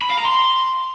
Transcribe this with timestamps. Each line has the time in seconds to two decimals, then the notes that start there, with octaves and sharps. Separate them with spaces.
0.02 B5
0.10 F5
0.18 A#5
0.26 C6